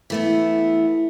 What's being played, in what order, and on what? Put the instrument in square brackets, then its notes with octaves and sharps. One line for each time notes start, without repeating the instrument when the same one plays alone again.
[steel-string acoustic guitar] E3 A3 B3